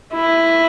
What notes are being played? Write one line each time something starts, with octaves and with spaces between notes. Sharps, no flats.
E4